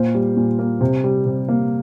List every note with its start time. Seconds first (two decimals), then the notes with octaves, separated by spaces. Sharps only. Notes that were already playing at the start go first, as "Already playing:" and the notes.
Already playing: A#2 A#3 C5
0.14 G3
0.36 A#2
0.59 A#3
0.81 C3
1.04 G3
1.26 C3
1.49 A#3